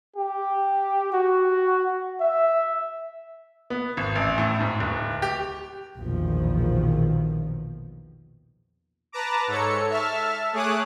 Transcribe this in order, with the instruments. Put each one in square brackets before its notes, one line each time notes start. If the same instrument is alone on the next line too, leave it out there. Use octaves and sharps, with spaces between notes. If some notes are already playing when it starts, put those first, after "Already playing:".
[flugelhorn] G4
F#4
E5
[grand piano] B3
G#1
A1
A2
G#2
D1
G4
[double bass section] A#1 E2 B2 D#3 F3
[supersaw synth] B4 A5 A#5 D6
G#2 A4 C#5 C#7
E5 A5 F6
A3 G#4 C#5 D6 D#6 F#6